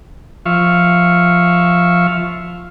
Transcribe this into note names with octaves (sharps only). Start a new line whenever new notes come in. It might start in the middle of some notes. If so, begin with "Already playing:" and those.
F3 E5 F5 C#6